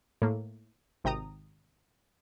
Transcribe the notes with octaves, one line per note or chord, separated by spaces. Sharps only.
A2 A#3
G#1 C3 G5 A#5 D#6